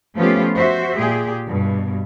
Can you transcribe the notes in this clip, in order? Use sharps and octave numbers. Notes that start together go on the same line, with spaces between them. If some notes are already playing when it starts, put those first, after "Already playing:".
F3 A3 B3 C#4 F4 G4
F#4 C5 E5
A#2 G4 G#4
G2 B2